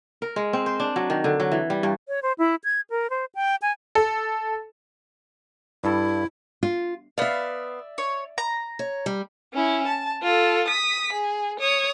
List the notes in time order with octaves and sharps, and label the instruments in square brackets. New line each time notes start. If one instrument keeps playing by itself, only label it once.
[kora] A#4
G#3
C4
C5
D4
F#3
D#3
D3
F#3
E3
G3
G2
[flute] C#5
C5
E4
G#6
A#4
C5
G5
G#5
[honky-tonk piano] A4
[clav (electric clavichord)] G2 A4 [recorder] E4
[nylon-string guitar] F4
[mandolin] B3 F5 [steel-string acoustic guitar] D5 E5
[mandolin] C#5
A#5
[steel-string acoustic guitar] C#5
G3
[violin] C#4 E4
A5
F4 A4
D#6 B6
G#4
C#5 D#6